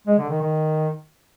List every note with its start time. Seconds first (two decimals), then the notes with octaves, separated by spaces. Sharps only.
0.07 G#3
0.18 D3
0.30 D#3
0.41 D#3